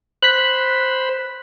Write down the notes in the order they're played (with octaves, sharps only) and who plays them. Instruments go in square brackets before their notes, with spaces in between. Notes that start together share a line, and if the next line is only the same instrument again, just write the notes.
[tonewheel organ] C5 B5 [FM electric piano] F#6 B6